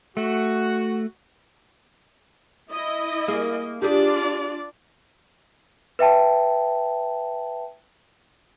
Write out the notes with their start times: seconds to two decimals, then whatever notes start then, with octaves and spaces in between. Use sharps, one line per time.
0.17 A3 F#4
2.71 E4 D#5
3.28 A#3 G#4
3.82 D4 F4 G4 G#4 D5
5.99 B4 E5 G5 A5